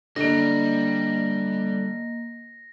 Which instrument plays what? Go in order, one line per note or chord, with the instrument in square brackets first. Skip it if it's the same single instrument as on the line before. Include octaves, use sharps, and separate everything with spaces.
[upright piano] D3 [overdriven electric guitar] G3 [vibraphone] A#3 D#5 [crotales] A#6